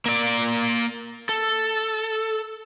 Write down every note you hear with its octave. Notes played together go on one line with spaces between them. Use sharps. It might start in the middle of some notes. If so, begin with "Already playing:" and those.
A#3 D5
A4